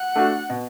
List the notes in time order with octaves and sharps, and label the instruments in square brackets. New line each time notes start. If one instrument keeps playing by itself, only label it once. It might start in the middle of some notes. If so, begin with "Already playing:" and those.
Already playing: [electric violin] F#5
[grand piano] A3 D4 F#4
B2